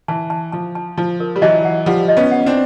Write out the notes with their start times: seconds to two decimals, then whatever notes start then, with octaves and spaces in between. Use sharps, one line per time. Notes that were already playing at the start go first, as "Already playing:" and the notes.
0.08 E3 A5
0.30 A5
0.52 F3 A5
0.75 A5
0.98 F3 A5
1.20 A#4
1.36 G3
1.42 E3 F#3 D#5
1.65 F#5
1.86 F3 G3 F#5
2.08 D#5
2.17 B3 C#4
2.32 F#5
2.46 C4 D4